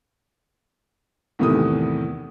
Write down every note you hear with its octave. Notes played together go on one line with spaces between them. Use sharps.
E2 A2 C3 D#3 E3 D#6